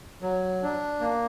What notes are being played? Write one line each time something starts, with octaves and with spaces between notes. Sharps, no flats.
F#3
D4
A#3